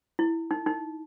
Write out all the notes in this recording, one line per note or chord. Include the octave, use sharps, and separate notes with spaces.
E4
D#4
D#4